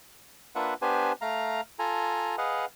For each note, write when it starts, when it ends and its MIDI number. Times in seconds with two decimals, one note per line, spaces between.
0.55 0.74 58
0.55 0.74 62
0.55 0.74 65
0.55 0.74 71
0.55 0.74 76
0.55 0.74 78
0.82 1.12 59
0.82 1.12 62
0.82 1.12 67
0.82 1.12 71
0.82 1.12 72
0.82 1.12 80
1.21 1.61 57
1.21 1.61 77
1.21 1.61 82
1.79 2.36 65
1.79 2.36 69
1.79 2.36 80
1.79 2.36 82
2.38 2.65 68
2.38 2.65 71
2.38 2.65 75
2.38 2.65 77
2.38 2.65 78